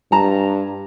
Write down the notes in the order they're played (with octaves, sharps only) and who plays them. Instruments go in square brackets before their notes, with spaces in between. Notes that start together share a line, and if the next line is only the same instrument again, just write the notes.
[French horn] G2 [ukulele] A5 A#5